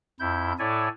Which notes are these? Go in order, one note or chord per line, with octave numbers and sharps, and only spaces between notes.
F2 E4 G6
A2 E4 A4 C#5 D5 G#5